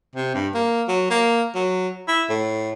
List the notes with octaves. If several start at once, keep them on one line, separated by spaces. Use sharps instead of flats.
C3
G2
A#3
F#3
A#3
F#3
E4
A2